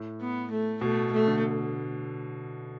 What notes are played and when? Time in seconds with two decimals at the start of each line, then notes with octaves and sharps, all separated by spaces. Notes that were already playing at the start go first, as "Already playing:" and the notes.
Already playing: A2
0.21 B3
0.51 A3
0.81 B2 A3
1.12 A3
1.27 D3